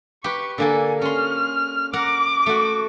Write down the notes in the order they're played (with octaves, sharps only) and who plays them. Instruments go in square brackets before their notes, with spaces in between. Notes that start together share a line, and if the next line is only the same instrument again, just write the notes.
[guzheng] G4 B4 [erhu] C#6
[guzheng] D3 A#3 A4 [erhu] G#5
[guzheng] C#4 C6 [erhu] F6
[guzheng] A#4 F#5 A#5 [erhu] D6
[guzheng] A3 F#4